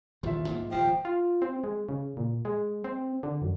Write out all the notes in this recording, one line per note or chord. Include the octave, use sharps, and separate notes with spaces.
D#1 A1 D#3 F4 E5
A#1 G#2 A#3
D#1 F3 G5
F4
C4
G#3
C#3
A#2
G#3
C4
D3
F#2